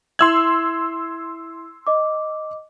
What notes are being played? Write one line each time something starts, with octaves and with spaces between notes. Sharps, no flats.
E4 E5 C6 E6 G#6 F#7
D#5 D6